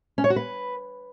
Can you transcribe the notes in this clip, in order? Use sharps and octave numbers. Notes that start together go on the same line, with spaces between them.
C#4
C#5
F#4
B4